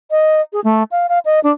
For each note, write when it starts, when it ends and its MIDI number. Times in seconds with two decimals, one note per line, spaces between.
0.11 0.41 75
0.53 0.60 68
0.64 0.83 57
0.92 1.07 77
1.09 1.19 77
1.25 1.40 75
1.44 1.52 62